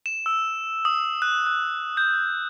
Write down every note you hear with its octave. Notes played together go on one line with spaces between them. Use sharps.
E7
E6
D#6
F#6
F#6
G6